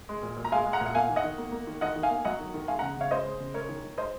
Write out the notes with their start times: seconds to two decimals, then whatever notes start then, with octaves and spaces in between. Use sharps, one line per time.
0.09 G#3
0.23 A#2
0.37 A#2
0.45 A#5
0.52 G#3 F5 G#5
0.66 G#3
0.73 F#5 A#5
0.81 A#2
0.86 F#5
0.95 A#3 F5 G#5
1.09 D#3
1.16 D#5 F#5
1.24 D#3
1.38 A#3
1.52 A#3
1.67 D#3
1.81 D#3 D#5 F#5
1.96 D#3
2.03 F5 G#5
2.10 A#3
2.25 F#3 D#5 F#5
2.39 D#3
2.54 D#3
2.68 G#3 F5 G#5
2.79 C#3 F#5 A#5
2.97 C#3 C#5 F5
3.11 G#3 C5 D#5
3.26 G#3
3.40 C#3
3.54 G#3 A#4 C#5
3.69 D#3
3.84 D#3
3.97 G#3 C5 D#5